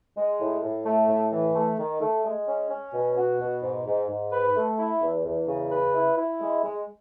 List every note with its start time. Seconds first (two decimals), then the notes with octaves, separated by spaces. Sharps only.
0.17 G#3
0.40 A2
0.63 A2
0.86 A3
1.09 A2
1.32 E3
1.55 A3
1.78 D#3
2.01 A3
2.25 G#3
2.48 C#4
2.71 C#4
2.94 B2
3.17 F#4
3.40 B2
3.63 G#2
3.87 G#2
4.09 G#2
4.32 B4
4.56 A3
4.79 E4
5.02 E2
5.25 E2
5.48 C#3
5.71 B4
5.95 E4
6.18 E4
6.41 G#3
6.64 G#3